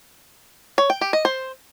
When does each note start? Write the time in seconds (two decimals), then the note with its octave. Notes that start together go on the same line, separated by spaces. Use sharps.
0.78 C#5
0.90 G5
1.01 G4
1.13 D#5
1.25 C5